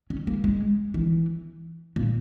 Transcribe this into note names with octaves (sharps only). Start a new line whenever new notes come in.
C#4
A#3
G#3
E3
A#2